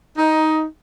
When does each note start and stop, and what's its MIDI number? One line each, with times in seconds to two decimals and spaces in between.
0.17 0.65 63